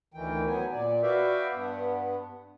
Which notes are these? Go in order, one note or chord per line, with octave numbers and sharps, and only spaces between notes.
D2 D#3 E3 G5
F#3 B3 G#5
A#2 D5
F#4 B4 D5 E5 F5 G5
G2 B3